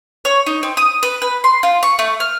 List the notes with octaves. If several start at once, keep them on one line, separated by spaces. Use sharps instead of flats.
C#5
D#4
C4
D#6
B4
B4
C6
F4
C#6
A3
F6